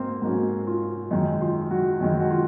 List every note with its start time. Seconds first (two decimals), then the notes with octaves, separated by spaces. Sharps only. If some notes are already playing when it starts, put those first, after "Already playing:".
Already playing: G#2 A#3 C4 C5
0.22 G#2 F#3 A#3 C#4
0.67 F4
1.11 F#2 D#3 G#3 D#4
1.41 F4
1.70 F#3 F#4
2.01 F#2 D#3 G#3
2.19 F#4
2.30 F4